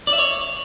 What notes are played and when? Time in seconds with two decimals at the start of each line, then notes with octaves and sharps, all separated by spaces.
0.07 D5
0.13 E5
0.18 C#5